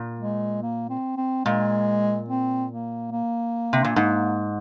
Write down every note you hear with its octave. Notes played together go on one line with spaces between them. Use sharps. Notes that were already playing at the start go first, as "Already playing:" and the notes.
Already playing: A#2
G#3
A#3
C4
C4
A#2 G#3
C4
A#3
A#3
C3
A#2
G#2